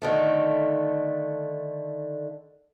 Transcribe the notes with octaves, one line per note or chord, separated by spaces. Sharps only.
D3 D#3 A3